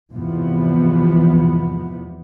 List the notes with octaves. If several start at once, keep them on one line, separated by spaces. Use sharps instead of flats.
E2 G#2 C3 E3 F3 B3